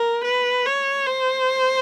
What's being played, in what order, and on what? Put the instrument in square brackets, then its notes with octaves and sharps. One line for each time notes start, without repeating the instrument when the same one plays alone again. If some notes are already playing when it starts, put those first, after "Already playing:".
Already playing: [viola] A#4
B4
C#5
C5